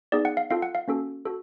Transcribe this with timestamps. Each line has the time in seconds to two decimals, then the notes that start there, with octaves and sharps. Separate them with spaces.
0.12 B3 D#4 G#4 D5
0.25 F#5
0.37 F5
0.50 C4 F4 A4 F5
0.62 F#5
0.75 F5
0.88 A#3 C#4 F#4 A4
1.25 F#4 A4